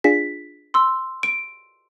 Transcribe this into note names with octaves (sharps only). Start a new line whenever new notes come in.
D4 F4 G#4 B6
C6 E6
D7